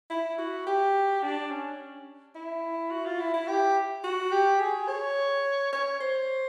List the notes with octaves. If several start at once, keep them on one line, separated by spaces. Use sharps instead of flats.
E4
F#4
G4
D4
C#4
E4
F#4
F4
E4
E4
G4
F#4
G4
G#4
C#5
C#5
C5